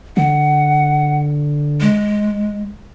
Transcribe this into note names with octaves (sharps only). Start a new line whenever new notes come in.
D3 F#5
G#3